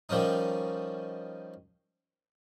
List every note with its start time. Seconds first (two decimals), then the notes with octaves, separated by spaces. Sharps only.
0.09 D#3 F3 G3 C#4 D#4